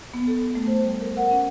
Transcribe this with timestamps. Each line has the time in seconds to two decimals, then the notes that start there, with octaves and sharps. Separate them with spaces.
0.13 B3
0.27 A4
0.55 A3
0.67 C5
0.82 G3
1.01 A#4
1.17 F#5
1.31 C#4